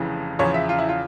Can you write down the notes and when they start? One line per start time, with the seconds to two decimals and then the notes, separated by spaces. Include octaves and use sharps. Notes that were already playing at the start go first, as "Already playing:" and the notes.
Already playing: F1 F2 C#3 E3
0.39 E2 C#3 F3 C#5
0.54 E5
0.69 F4
0.79 E4
0.89 F4